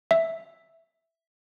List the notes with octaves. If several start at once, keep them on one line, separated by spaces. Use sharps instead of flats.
E5